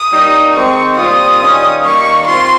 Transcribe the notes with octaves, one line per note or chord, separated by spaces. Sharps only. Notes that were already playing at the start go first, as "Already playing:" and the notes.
Already playing: D#6
G3 A#3 D#4
D#3 G#3 C4 C#6
A#2 G3 C4 F4 D#6
D#3 G3 C#4 F4
D#3 G3 A#3 C#6
C4 F4 C6